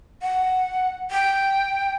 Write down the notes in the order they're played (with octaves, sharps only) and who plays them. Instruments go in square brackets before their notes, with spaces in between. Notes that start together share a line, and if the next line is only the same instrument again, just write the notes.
[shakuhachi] F#5
G5